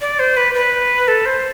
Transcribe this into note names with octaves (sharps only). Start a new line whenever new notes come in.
D5
C5
B4
B4
A4
C5